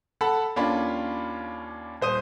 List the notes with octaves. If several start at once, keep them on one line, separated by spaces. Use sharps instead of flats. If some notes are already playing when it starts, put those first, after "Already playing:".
A4 F#5 A5 B5
D#2 A#3 C#4 D4 F4 B5
D#1 C5 D#6 D#7